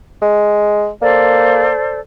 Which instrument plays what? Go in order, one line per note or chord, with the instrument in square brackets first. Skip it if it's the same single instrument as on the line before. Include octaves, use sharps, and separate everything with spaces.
[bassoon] G#3
[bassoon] A#3 [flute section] A4 C5 D5